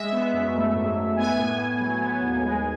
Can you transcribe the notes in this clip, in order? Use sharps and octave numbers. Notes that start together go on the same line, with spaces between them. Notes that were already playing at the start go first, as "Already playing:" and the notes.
Already playing: G#3 E5
B3
F#2
A3
G#2
G#2
B3 G#5
A2
A2
F#3
B3
D#2
G#3